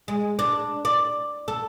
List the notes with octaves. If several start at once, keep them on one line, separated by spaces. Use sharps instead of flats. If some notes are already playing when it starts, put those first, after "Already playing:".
G#3
D4
D5
A4